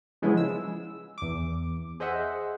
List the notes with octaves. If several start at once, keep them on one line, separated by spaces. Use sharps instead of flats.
C#3 F3 G#3 B3 C#4 E4
E6
E2 D6
G#4 C5 D#5 E5 F#5